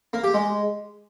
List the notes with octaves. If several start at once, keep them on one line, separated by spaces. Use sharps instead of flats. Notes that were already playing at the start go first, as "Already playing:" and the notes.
A#3
G4
G#3